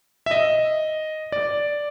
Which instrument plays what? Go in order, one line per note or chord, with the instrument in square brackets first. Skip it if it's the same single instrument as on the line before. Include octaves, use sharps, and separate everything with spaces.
[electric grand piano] E5
D#5
D5